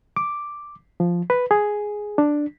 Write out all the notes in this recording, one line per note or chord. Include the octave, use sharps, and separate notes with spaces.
D6
F3
B4
G#4
D4